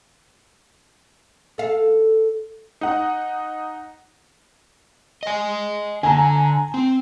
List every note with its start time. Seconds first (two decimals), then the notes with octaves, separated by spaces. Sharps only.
1.58 A4 F5
2.81 D#4 F#5
5.23 D#5 G#5
6.03 D3 G#5 A#5
6.74 C4